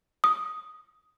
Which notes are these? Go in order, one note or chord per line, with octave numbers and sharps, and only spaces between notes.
D#6